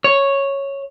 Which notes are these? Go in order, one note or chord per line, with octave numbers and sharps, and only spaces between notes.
C#5